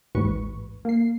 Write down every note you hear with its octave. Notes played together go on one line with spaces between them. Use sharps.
A1 D#2 G#2 B4 C#6
A#3 C7